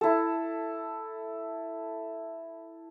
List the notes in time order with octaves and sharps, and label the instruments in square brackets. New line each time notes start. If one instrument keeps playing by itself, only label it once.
[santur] E4 A4